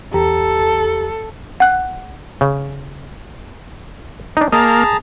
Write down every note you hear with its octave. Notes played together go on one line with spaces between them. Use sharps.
E2 G4 A4 A#5
F#5 F#6
C#3
D4 D#4
A#3 G#4 D#5 A5 A#5